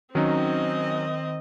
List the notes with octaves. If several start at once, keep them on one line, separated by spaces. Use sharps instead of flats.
D#3 F#3 C4 C#4 D#4 D#5